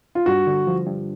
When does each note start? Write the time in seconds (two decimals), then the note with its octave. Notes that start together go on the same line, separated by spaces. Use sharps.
0.15 F4
0.26 G2 F#4
0.47 D3
0.67 F3
0.87 G2